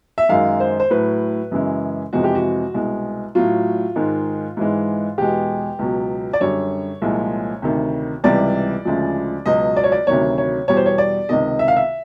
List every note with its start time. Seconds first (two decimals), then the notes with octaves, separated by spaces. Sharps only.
0.18 E5
0.29 F#2 D#3 G#3 F5
0.60 C5
0.80 C5
0.90 A2 F#3 B4
1.51 F#2 C#3 E3 G#3
2.13 F2 C3 E3 G#3 F#4
2.24 G4
2.35 F#4
2.74 C2 B2 G#3
3.35 A2 F#3 F4
3.96 G#2 D#3 G#3
4.57 G#2 E3 G#3
5.18 E2 B2 G#3 G4
5.79 C#2 B2 F#3
6.33 D5
6.40 F#2 D3 G3 C#5
7.02 C2 A#2 F3 G#3
7.62 D2 C3 D#3
8.24 C#2 C3 E3 G3 D5
8.85 D2 C#3 F3 G#3
9.46 C#2 B2 F#3 D#5
9.77 D5
9.84 C#5
9.92 D5
10.07 D2 C3 D#3 F#3 C#5
10.38 C#5
10.68 E2 B2 G3 C#5
10.77 C5
10.86 C#5
10.98 D5
11.29 C#2 C3 D#3 D#5
11.59 E5
11.68 F5
11.76 E5